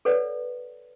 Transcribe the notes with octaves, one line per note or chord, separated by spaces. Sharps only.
A4 B4 C#5 D5 F#5